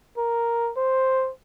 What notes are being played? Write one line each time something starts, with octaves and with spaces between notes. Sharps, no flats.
A#4
C5